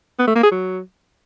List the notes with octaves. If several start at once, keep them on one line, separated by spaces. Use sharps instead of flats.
B3
A3
A#3
G#4
F#3